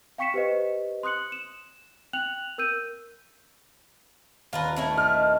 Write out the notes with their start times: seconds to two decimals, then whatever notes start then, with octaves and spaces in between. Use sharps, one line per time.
0.18 F5 G5 C#6 B6 C#7 E7
0.34 G4 B4 C5 D#5
1.03 C6 D#6 F#6 C#7 F#7
1.32 E7
2.13 G5 F#6 F7 F#7
2.58 A#4 E6 G6 D#7
4.53 D#1 F4 A#4 B4 A5
4.76 A3 C#4 E4
4.98 A#4 D#5 F6